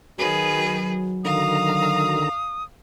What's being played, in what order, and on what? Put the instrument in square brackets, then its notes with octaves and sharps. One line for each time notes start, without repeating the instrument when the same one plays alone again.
[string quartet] D#3 G#4 B4 [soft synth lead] F#3
[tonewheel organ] D3 D#3 A#5 [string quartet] F5 [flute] D#6